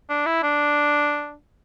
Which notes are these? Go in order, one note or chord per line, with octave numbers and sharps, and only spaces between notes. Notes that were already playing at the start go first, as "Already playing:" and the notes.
D4
E4
D4